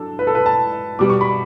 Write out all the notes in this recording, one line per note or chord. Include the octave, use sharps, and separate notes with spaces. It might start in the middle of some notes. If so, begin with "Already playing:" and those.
Already playing: F#3 D4 A4
B4
A4
B4
A5
B2 G3 B3 D6
C#6
B5